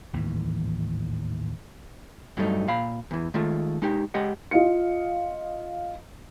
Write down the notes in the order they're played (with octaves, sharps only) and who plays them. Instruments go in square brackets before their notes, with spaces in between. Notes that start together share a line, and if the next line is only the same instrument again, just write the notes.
[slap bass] A1 D#2 G#2 E3
[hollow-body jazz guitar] G2 F#3 G3 A3 D#4
A#2 F5 B5
E2 E3
D#3 G#3 A3 F4
G#3 D#4 G4
G#3 G4 D#5 F#5
[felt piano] F4 D#5 F5 C#7